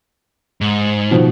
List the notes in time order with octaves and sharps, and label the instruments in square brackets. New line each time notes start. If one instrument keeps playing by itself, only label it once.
[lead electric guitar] G#2
[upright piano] B2 D#3 F3